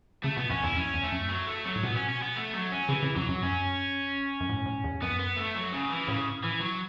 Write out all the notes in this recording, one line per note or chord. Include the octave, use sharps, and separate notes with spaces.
C#3 A3
B2 B3
F#2 C#4
E2 E4
F#2 C#4
E2
A3
F#2
F#3
A3
F#3
A2
B2 B3
C#4
C#4
B3
A3
F#3
C#4
C#3 E3
C#3
F#2 F#3
F#2
F#2 C#4
F#2
A2
A2
E2
F#2 B3
B3
A3
F#3
C#3
E3
A2 C#3
E3
F#3